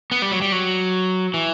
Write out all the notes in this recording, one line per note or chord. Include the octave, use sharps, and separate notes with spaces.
B3
G3
F#3
G3
F#3
E3